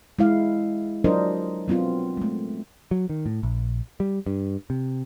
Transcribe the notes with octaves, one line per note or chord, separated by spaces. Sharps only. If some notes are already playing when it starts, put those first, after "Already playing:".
G#3 E4 F5
F#3 D4 F4 A#4 C5 D#5
F#3 B3 C4 F4
G#3 A3
F#3
D#3
A2
A#1
G3
G2
C3